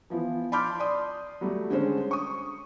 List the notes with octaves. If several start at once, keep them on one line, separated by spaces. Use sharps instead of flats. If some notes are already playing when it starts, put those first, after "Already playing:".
E3 F3 B3
A5 B5 C6 D6 F6 G6
D5 C6 D#6
F#3 G3 A3
D3 G#3 C#4 C5
C#6 D#6